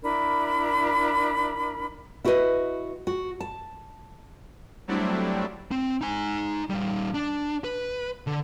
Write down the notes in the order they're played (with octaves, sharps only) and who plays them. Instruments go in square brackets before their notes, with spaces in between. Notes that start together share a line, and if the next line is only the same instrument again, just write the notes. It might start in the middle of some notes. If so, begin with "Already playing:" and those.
[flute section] D4 E4 A#4 B5
[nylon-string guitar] E4 F#4 G4 A#4 B4 D#5
F#4
A5
[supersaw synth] F#3 G3 A3 C4 D4 E4
[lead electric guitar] C4
D#4 G#5
G3 D#4
D4
B4
D3